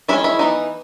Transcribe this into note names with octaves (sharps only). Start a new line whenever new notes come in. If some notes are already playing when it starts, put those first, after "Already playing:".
D#3 G#3 C#4 E4
E4
E3 B3 D#4